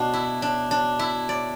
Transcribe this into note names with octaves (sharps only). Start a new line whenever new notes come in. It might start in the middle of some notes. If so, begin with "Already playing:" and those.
Already playing: B2 D4
E4
D4
D4
E4
D5